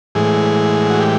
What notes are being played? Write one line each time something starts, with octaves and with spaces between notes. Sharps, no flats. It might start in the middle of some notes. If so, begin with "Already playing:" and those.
A2 E3 G#3 G#4
F#4
G4